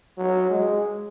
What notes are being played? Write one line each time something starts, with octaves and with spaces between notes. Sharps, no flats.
F#3
G#3